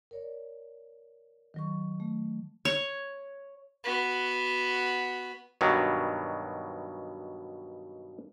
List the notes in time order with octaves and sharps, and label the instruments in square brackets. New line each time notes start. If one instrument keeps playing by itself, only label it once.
[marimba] A#4 C#5 D5
D#3 F#3 C#6
A3
[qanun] C#5
[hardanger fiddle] B3 F#4
[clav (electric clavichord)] G2 B2 D#3 F#3